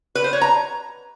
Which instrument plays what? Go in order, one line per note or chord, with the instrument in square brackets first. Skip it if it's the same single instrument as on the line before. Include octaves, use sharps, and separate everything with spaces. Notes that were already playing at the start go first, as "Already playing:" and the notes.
[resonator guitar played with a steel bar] B4
C5
C#5
A#5